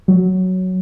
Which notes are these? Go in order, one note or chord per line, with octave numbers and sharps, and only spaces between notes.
F#3